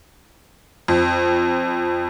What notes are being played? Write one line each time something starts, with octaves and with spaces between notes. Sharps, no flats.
F2